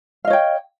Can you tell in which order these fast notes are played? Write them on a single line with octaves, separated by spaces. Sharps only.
F5 D#5 C#5 G5